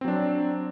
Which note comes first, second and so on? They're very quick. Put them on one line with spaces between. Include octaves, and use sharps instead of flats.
C4 F#3 D4